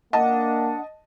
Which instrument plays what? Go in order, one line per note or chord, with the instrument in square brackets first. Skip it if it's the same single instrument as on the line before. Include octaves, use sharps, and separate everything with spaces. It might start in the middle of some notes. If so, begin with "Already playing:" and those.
[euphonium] A#3 [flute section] D4 F#5 [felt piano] D#5 A5